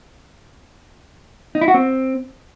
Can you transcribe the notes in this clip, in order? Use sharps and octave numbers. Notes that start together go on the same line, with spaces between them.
D#4
E4
F#4
C4